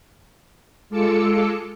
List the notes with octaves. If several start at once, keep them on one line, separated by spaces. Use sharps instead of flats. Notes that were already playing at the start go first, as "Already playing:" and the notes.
G#3 F4 A4 D6 E6 C#7